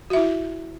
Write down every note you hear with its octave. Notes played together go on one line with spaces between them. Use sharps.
E4 F#4 E5